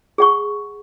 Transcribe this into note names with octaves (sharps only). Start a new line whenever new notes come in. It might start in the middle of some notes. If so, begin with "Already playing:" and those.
G#4 F#5 C#6